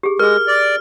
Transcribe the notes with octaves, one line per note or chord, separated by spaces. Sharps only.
G4 G#4
G#3 G#4 A#4 F6
D5